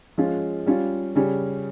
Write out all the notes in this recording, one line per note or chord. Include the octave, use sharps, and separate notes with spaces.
F3 G#3 C#4 F4
G3 C#4 F4
C#3 G3 C#4